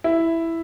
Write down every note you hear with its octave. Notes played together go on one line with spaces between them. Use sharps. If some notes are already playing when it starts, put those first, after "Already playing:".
E4